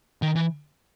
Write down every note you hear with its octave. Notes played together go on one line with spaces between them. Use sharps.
D#3
E3